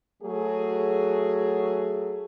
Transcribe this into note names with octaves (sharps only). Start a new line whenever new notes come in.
F#3 A3 G#4